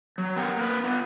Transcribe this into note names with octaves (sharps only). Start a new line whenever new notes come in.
F#3
B3 G4 A#4 F#5
A#3 A#4 B4
B3 F4